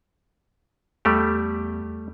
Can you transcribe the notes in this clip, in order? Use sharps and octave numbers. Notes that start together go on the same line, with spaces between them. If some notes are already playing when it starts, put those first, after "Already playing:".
E2 G3 A3 G4